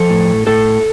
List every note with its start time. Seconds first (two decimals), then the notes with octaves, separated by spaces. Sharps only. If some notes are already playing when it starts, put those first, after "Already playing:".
Already playing: F3 A4
0.10 A2
0.47 A2 A4